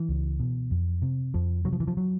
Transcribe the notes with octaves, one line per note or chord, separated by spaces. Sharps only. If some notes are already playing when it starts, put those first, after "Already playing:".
Already playing: E3
C#2
B2
F2
C3
F2 F3
C3 F#3
F3
E3
F3
F#3